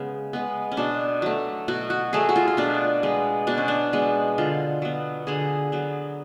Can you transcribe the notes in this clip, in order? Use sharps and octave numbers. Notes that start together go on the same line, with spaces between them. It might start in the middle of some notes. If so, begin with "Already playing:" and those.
Already playing: C#3 G#3 B3
G#3 B3
C#4
B2 D4
F#3 A3
B2 F#4
F#4
F#3 A3 G#4
F#4
F4
F4
B2 D4
G#3 B3
B2 D4
C#4
D4
G#3 B3
D3 F4
F#3 B3
D3 G#4
F#3 B3